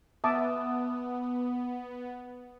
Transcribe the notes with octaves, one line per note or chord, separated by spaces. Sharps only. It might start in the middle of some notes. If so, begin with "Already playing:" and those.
B3 E5 A5 D6 D#6